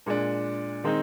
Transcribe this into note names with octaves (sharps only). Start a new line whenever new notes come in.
A#2 G#3 D4
D#3 G#3 C4 D#4